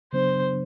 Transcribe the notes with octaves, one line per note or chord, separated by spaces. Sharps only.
C#3 F#3 B3 D4 C5